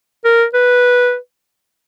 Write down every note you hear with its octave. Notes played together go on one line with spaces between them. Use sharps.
A#4
B4